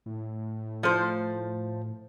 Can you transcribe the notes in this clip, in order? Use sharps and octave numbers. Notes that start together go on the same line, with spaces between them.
A2
F3 A4 C5